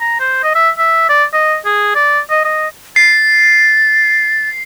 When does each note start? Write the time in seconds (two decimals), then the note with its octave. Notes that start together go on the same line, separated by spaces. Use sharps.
0.01 A#5
0.20 C5
0.43 D#5
0.55 E5
0.78 E5
1.09 D5
1.33 D#5
1.65 G#4
1.95 D5
2.30 D#5
2.44 D#5
2.96 A6 C7